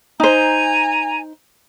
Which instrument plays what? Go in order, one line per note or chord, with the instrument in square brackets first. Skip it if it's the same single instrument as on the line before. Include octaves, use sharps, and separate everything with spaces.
[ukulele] D#4 C5 [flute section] G#5 A#5